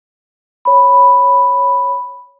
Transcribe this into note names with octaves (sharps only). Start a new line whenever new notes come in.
C#5 B5